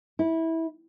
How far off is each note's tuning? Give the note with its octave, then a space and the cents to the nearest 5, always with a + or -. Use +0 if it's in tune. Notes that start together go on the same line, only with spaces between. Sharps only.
E4 -20